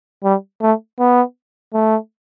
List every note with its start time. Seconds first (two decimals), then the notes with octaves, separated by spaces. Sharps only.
0.24 G3
0.61 A3
0.99 B3
1.74 A3